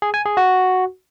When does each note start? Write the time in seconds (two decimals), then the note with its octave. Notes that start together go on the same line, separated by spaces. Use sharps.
0.02 G#4
0.14 G#5
0.25 G#4
0.37 F#4